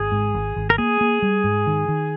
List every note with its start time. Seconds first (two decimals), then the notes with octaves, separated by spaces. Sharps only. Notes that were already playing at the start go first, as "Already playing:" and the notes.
Already playing: G#1 G#4
0.12 G#2
0.34 G#1
0.56 G#1
0.70 A#4
0.78 A#3 G#4
1.01 A#3
1.22 G3
1.44 G#2
1.67 D#3
1.88 D#3